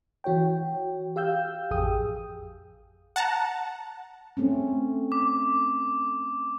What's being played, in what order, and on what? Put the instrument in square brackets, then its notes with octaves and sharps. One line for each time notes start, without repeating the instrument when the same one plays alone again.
[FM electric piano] E3 F#4 C#5 G5
G4 F5 E6 G6
A1 F2 G#4 G5 D#6
[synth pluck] F#5 A5 A#5
[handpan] A3 C4 C#4
[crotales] D6